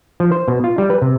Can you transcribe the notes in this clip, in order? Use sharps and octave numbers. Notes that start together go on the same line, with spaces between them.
F3
C5
B2
F4
G3
B4
C3